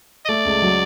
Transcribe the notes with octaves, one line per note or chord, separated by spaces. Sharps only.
D#5
A3 D5
C#2
F#3